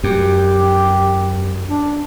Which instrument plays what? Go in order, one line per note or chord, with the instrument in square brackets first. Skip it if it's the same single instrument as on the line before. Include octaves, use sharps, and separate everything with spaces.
[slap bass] F#2 [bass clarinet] G4
[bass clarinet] D4